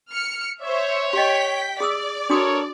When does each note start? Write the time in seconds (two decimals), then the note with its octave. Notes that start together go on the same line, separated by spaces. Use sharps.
0.11 F6 C#7
0.62 C5 C#5 E5
1.13 G4 D#5 G5 B6
1.80 G#4 D5 D#6 E6
2.30 D4 F#4 A4 A#4 C#5 D#6